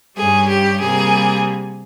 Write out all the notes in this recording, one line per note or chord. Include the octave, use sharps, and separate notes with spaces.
G2 G3 C#4 G#4
G4
C3 G3 A#3 G#4